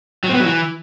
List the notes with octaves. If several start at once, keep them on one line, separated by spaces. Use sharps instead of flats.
F#3
C4
B3
F#3
E3